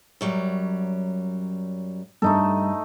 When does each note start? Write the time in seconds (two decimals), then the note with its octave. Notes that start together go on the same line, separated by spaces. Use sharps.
0.21 F#2 F#3 G3
2.22 G2 A3 D#4 A4